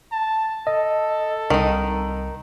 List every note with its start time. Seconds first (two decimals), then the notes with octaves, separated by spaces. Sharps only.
0.12 A5
0.67 A4 D#5
1.50 C2 D#3 D#4